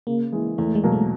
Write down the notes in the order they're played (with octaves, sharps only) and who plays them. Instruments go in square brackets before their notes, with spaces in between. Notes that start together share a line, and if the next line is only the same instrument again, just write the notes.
[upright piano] C#3 [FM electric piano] A#3
[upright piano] E3 G#3
[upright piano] E2 [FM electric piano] A3
[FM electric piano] G#3
[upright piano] B2 F#3 A#3
[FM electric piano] A3